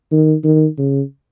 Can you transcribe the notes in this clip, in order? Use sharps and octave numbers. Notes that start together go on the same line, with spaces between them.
D#3
D#3
C#3